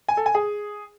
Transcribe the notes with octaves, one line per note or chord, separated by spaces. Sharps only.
G#5
A4
G#5
G#4